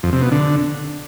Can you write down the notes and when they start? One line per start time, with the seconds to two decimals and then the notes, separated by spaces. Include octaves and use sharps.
0.03 F2
0.13 C3
0.22 B2
0.31 D3